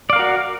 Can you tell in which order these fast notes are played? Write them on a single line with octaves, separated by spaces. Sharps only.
D5 F5 A#4 F#4